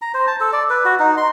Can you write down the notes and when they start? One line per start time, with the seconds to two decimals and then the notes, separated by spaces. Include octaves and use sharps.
0.02 A#5
0.14 C5
0.27 A5
0.40 A4
0.53 D5
0.70 B4
0.85 F#4
1.00 D#4
1.17 C6